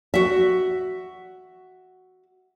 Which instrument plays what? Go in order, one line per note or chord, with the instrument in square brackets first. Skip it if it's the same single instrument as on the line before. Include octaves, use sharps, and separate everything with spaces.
[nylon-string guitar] F#4 E5